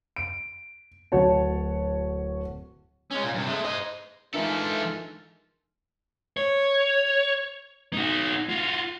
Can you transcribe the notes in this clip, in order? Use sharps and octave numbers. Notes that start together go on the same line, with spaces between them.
D7
D1 F#4 C#5 A5
G#3 C#4
A#2
G2 C3
G#3 A3
C5 D#5
E3 G#3 A3 D4 D#4 F4 A4 A#4
C#5
D#4 F#4
F4 F#4